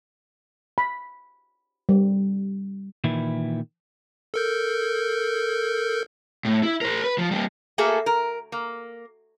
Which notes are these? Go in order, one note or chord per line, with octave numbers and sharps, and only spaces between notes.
B5
G3
A#2 D#3 E3 E4
A4 A#4 G6
A2
E4
A#4 C5
B4
F3
G3 A#3
A3 A#3 F#4 G#4 A4
A#4
A#3